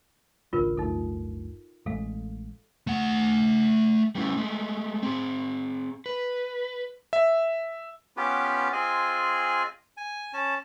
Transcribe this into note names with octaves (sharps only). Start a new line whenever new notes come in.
G#1 C#2 D4 F4 A#4 B4
D1 G1 D2 D#4 A4
A1 G#3 A4 F5
A3 F#5
G3 A3 B3 C#4 E4
G#3 A3
C4 G#4
B4
E5
B3 C#4 F4 G4 B4
C4 F4 G#4 D#5 G#5
G#5
C#4 A5